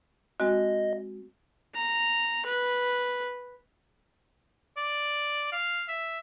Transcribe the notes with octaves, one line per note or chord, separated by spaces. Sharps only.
G#3 C4 F#4 D#5
A#5
B4
D5
F5
E5